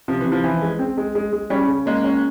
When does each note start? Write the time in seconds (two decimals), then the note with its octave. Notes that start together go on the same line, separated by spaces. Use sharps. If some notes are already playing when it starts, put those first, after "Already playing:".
0.08 C3 F3
0.21 E3
0.26 C3
0.32 F3
0.44 E3
0.62 G#3
0.79 C4
0.97 G#3
1.15 G#3
1.33 G#3
1.50 G3 C#4
1.68 C#3
1.86 G#3 A#3
2.04 C#4